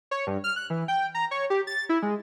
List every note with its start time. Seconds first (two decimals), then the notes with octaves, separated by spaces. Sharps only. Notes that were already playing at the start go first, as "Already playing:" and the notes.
0.11 C#5
0.27 G2
0.44 F6
0.56 F#6
0.70 E3
0.88 G5
1.15 A#5
1.31 C#5
1.50 G4
1.67 A6
1.89 E4
2.02 G#3